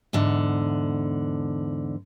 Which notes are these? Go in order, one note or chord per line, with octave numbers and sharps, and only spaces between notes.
E2 G#2 D3